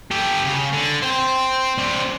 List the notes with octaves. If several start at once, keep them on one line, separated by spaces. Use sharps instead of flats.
G4 A4
C#3
D3
C5 G5
C4 D4